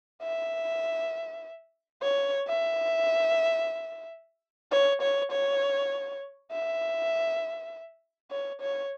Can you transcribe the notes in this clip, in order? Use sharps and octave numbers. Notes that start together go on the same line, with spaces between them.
E5
C#5
E5
C#5
C#5
C#5
E5
C#5
C#5